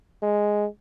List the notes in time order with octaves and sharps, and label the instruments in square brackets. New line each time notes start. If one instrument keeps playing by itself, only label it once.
[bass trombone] G#3